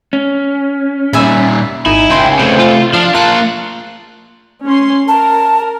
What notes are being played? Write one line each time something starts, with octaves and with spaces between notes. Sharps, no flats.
C#4
A#2 G3 E5 G#5 B5
G#1 D#4 E4 G#5
C#2 G5 G#5 C6
C3 A3 C5 G#5
F4
F3 D4 F5 F6
A#3 F4 A5 F#6
C#4 C6
A#4 A5